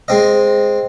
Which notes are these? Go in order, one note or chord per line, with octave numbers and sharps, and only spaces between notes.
G#3 C4 D#5